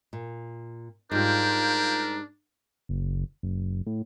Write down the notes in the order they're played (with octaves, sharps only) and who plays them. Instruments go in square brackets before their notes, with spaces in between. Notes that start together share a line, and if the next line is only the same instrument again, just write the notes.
[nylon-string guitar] A#2
[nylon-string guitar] G#2 G3 [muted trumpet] D4 [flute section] F4 G6 [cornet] A#4
[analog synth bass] F#1
F#1
A2